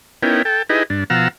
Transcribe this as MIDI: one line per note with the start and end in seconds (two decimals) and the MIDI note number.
0.23 0.42 59
0.23 0.42 61
0.23 0.42 63
0.23 0.42 64
0.23 0.42 70
0.23 0.42 79
0.45 0.62 69
0.45 0.62 79
0.70 0.83 63
0.70 0.83 64
0.70 0.83 67
0.70 0.83 68
0.70 0.83 71
0.70 0.83 75
0.90 1.04 43
0.90 1.04 62
1.10 1.28 47
1.10 1.28 53
1.10 1.28 77
1.10 1.28 78
1.10 1.28 82
1.10 1.28 88